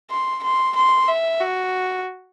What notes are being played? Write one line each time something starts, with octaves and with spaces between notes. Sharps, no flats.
C6
C6
C6
E5
F#4